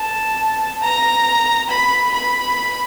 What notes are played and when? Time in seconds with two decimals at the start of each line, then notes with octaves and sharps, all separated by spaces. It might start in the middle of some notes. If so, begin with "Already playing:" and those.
Already playing: A5
0.82 A#5
1.69 B5
2.14 B5